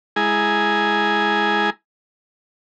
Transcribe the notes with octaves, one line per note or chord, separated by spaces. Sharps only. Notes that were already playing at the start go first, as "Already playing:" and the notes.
G#3 E4 G#4 G#5 A#5